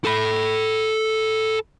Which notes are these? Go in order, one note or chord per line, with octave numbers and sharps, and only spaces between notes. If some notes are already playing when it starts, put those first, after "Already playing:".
A4 B5